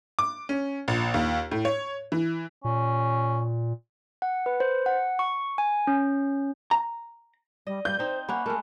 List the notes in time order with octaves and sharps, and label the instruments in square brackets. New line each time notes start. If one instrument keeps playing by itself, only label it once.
[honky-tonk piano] D6
C#4
A#1
D#2
A2
C#5
E3
[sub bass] A#2 [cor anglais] C#4
[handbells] F#5
B4
C5
F#5
C#6
G#5
C#4
[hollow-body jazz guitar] A#5
[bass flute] G3 [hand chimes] D5 [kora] D#5
[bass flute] G3 [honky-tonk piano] G6
[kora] C4 D#4 [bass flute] C5
[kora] A#3 C#4 [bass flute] F#5 [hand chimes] B5 F#6
[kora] G#3 A3 [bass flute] A#4